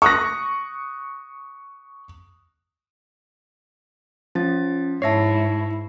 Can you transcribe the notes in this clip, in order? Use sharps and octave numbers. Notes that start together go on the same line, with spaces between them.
C#6 D#6 F#6 A#6
F3 C#4 A6
G#2 E4 C#5 E5 A5 A#6 C7